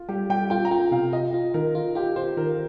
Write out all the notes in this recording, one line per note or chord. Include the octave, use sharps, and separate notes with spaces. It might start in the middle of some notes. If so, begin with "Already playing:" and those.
Already playing: F4
G3 G4
G3 G5
F4 G5
A#5
F4 G5
C3 F5
F4 D#5
F4
D#3 A#4
F4
F4 G4
F4 C5
D#3 A#4